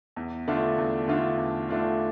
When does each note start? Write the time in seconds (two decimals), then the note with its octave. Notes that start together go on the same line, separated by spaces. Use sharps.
0.16 E2
0.48 D3 A3 D4 F4
0.78 E2
1.08 D3 A3 D4 F4
1.38 E2
1.69 D3 A3 D4 F4